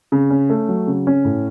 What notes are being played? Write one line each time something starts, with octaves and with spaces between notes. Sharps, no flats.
C#3
C#4
A3
F#3
C#3
C#4
A2